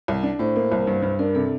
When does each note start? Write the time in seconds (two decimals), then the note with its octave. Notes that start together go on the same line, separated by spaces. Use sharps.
0.08 C2
0.23 D4
0.39 A2 C5
0.56 A#3
0.72 C2
0.87 G2
1.02 G2
1.19 D4 A#4
1.35 C3 A4